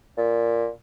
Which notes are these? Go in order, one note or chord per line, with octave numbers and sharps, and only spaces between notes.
A#2